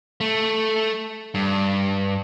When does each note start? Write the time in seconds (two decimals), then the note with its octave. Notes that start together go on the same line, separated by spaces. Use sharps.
0.21 A3
1.35 G2